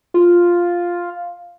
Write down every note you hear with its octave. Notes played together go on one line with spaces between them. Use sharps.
F4